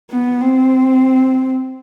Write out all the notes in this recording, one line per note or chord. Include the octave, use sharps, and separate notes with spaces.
B3
C4